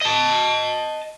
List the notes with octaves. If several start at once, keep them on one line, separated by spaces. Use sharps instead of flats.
D#5 A5